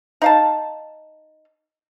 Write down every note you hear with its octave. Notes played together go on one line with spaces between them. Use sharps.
D#4 F5 A5